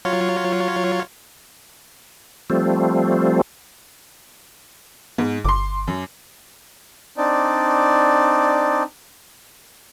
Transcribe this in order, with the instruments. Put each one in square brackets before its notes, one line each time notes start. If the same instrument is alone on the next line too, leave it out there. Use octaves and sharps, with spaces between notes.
[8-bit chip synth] F#3 F4 C#5
[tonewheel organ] F3 G3 A3 C4
[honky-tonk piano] G#2 [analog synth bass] B3
[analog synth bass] G1 [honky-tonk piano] C6 D6
[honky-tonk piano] F#2
[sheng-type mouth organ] C4 D4 D#4 D5